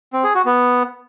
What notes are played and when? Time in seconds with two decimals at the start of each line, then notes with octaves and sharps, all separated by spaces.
0.13 C4
0.24 G#4
0.35 F#4
0.45 B3